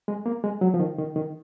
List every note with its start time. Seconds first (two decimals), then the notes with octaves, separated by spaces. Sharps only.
0.08 G#3
0.26 A#3
0.44 G#3
0.61 F#3
0.74 F3
0.80 D#3
0.98 D#3
1.15 D#3